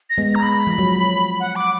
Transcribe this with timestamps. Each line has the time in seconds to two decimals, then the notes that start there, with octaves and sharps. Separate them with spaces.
0.10 A#6
0.18 G#3 B3
0.26 A#6
0.35 A#5
0.42 B5
0.67 F3
0.78 F#3
1.40 F#5
1.56 D6